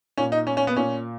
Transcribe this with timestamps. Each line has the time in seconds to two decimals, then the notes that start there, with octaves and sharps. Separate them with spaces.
0.17 A#2 C#4
0.32 D#4
0.47 C#4
0.57 C#4
0.67 B3
0.76 A#2 C#4